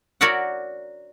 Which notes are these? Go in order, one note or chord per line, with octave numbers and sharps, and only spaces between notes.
F#4 A#4 C#5 D5 E5 F#5